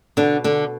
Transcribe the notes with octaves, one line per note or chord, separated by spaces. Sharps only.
B2 D3 D4
D3 D4